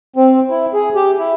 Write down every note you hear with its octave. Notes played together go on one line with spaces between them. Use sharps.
C4
E4
G#4
G4
E4